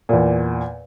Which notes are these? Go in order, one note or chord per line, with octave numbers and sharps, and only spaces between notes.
E2 A#2